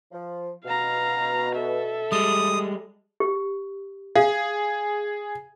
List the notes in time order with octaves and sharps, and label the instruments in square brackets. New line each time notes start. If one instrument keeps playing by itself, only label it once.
[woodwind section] F3
[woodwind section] B2 [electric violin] F5 A#5
[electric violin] A4 E5
[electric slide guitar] G3 G#3 [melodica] D#6
[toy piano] G4
[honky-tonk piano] G#4 [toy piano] F5